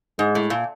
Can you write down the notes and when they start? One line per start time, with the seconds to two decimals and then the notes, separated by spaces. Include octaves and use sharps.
0.19 G#2 G#3
0.35 A2
0.50 A#2